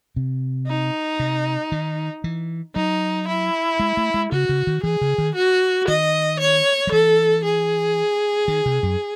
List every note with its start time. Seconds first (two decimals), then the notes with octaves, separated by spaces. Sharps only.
0.16 C3
0.67 D#4
1.20 C3
1.72 D#3
2.24 E3
2.76 F#3 D#4
3.28 E4
3.80 G#3
3.97 A3
4.14 G#3
4.32 C#3 F#4
4.49 C#3
4.67 D#3
4.84 E3 G#4
5.01 C#3
5.18 D#3
5.35 F#4
5.88 D#3 D#5
6.40 C#5
6.87 F#3
6.92 E3 A4
7.44 G#4
8.48 D#3
8.66 C3
8.83 F#2